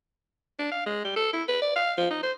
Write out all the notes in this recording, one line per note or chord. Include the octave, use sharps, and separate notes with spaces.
D4
F5
G#3
G3
A4
E4
B4
D5
F5
F3
D#4
C5